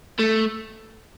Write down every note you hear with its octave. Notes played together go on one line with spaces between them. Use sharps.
A3